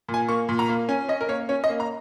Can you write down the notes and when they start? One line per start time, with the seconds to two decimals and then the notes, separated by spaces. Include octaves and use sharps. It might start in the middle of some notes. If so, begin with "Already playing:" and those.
0.09 A#2
0.14 G#5
0.28 A#3 C#6
0.49 A#2
0.59 A#5
0.69 A#3
0.89 C#4 G#5
1.08 C#4 D#5
1.21 A#4
1.28 A#3 C#5
1.49 C#4 C#5
1.64 D#5
1.69 A#3
1.80 A#5